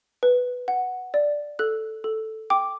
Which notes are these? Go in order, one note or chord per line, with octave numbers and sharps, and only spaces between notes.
B4
F#5
D5
A4 F#6
A4
G5 D6